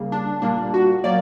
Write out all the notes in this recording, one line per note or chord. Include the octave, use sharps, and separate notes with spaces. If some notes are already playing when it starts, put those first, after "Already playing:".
Already playing: C#3 G3 A#3
D4
A#2 G3 A#3 D4
F#4
F#3 A#3 D5